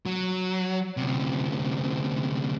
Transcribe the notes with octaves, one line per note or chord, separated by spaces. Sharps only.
F#3
D2 C3